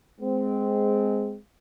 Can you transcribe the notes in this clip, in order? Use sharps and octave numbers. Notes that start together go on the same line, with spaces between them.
G#3 C4